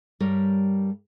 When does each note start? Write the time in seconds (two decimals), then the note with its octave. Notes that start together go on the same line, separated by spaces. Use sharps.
0.20 G2 G3 G4 A#4 C#5